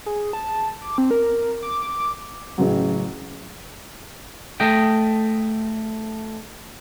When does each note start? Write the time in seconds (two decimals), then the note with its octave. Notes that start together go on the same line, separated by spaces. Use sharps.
0.06 G#4
0.33 A5
0.82 D6
0.98 C4
1.11 A#4
1.63 D6
2.58 A1 C#3 F#3
4.60 A3 D#5 G5